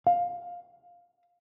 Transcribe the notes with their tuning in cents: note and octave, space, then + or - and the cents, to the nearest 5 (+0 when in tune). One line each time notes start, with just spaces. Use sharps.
F5 +10